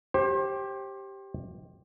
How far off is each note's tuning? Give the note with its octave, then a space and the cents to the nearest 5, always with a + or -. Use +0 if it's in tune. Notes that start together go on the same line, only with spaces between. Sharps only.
G4 +0 C5 +35